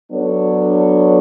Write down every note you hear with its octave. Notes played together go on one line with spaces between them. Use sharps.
F#3 B3 D4 A4 C#5